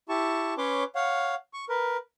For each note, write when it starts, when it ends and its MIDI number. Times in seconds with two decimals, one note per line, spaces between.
0.09 0.54 64
0.09 0.54 67
0.09 0.54 81
0.09 0.54 85
0.58 0.84 61
0.58 0.84 71
0.58 0.84 73
0.58 0.84 84
0.58 0.84 86
0.95 1.35 73
0.95 1.35 77
0.95 1.35 78
1.53 1.65 85
1.69 1.97 70
1.69 1.97 71